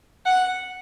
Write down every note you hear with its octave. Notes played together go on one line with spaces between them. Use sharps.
F#5